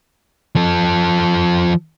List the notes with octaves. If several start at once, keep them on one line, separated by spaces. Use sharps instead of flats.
F3 A4